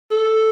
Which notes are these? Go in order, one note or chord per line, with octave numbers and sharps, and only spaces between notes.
A4